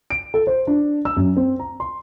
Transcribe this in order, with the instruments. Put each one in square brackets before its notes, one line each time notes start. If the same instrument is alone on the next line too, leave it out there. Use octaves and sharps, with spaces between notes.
[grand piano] D7
A4
C5
D4
E6
F#2
C4
A#5
C6